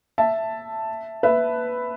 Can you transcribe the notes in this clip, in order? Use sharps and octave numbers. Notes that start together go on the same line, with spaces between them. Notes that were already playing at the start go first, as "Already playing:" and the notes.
E5 A5
B4 E5